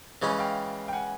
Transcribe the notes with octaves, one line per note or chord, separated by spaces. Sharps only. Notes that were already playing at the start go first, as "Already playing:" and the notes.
C#3 E3 G#3 C#4
F5 G5
G5
F#5 G#5